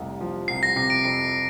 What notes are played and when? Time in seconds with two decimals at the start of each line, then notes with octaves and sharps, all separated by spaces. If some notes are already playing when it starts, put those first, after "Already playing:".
Already playing: F1 C2
0.21 F3
0.48 C2 C7
0.63 A#6
0.76 C3 C7
0.90 D7
1.04 F2 C7